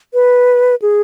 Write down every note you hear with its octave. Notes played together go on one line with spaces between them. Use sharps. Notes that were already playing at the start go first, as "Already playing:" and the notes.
B4
G#4